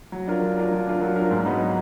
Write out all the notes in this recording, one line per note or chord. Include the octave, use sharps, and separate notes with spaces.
F#3
D4 F4 A#4
F#3
D4 F4 A#4
F#3
D4 F4 A#4
F#3
D4 F4 A#4
G#2
F#3 B3 D#4